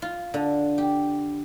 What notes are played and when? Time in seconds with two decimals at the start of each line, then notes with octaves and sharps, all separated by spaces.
0.02 F4
0.34 D3
0.78 G4